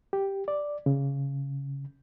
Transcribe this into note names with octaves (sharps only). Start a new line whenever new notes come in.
G4
D5
C#3